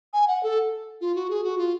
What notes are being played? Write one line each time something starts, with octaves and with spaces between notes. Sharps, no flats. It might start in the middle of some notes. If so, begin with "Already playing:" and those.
G#5
F#5
A4
F4
F#4
G#4
F#4
F4